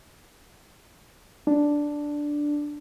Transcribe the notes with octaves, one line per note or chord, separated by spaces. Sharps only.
D4